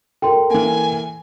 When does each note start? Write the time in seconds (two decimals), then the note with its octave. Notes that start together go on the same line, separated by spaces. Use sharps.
0.22 A4 A#4 G5 C6
0.50 E3 A#3 G#5